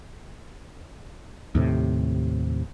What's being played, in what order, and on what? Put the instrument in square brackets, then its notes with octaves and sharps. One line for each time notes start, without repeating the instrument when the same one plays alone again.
[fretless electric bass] D#2 A2 C3